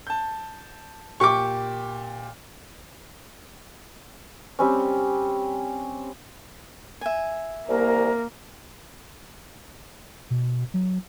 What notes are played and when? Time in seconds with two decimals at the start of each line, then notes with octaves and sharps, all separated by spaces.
0.07 A5 G6
1.20 A#2 G4 C#6 D6
4.59 G3 C4 C#4
7.01 E5 G#5
7.68 C2 A#3 A#4
10.30 B2
10.74 F#3